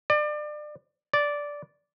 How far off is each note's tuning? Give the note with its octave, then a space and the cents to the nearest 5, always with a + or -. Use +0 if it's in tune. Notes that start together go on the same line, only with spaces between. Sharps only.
D5 +30
D5 -10